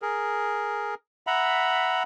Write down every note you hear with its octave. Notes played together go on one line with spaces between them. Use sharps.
G#4 A#4
E5 F#5 A#5 B5